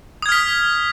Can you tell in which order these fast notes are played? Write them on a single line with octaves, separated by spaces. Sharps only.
D#6 G#6 F6 B6